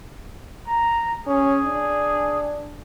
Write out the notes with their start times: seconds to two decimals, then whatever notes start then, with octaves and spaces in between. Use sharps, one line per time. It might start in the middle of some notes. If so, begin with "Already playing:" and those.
0.67 A#5
1.26 C#4 G#4
1.65 D4